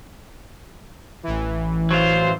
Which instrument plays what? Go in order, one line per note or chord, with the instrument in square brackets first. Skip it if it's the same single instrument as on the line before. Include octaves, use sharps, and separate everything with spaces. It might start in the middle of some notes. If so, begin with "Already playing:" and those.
[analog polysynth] A1 E3
[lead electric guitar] F#3 F4 [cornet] C5